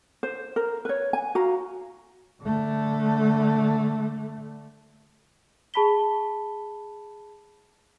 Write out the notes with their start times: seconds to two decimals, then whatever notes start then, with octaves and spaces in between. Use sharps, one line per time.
0.23 C5
0.56 A#4
0.85 B4 C#5
1.13 G#5
1.35 F#4 F5 A#5
2.42 D3 A3
5.74 G#4 A5 B5 B6 G7